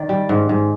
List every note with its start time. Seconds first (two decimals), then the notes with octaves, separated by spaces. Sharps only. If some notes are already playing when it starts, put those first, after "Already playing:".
Already playing: D#3 D5
0.09 G3
0.29 G#2
0.49 G#2